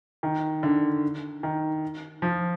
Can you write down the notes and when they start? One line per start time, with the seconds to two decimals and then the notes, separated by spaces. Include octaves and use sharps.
0.23 D#3
0.63 D3
1.43 D#3
2.22 F3